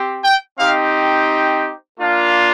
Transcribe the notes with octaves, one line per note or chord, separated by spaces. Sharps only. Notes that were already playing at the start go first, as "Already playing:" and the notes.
Already playing: C4 G4
G5
C4 D#4 G4 F5
A#3 D4 F4